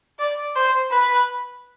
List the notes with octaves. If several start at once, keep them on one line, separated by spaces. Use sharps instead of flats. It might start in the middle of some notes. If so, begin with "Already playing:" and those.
D5
C5
B4